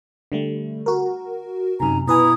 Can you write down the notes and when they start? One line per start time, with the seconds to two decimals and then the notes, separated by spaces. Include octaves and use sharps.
0.32 D3 G3 A3
0.86 F#4 A#4
1.80 F#2 C3 D#4 G#5 A#5
2.08 B2 E4 B4 G#5 A#5 D#6